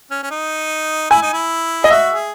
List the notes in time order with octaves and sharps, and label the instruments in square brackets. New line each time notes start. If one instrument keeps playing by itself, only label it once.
[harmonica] C#4
C#4
D#4
[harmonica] E4 [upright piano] G#5
[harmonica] D#4
E4
[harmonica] G#4 [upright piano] D#5
[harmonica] F#4 [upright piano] E5
[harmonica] G#4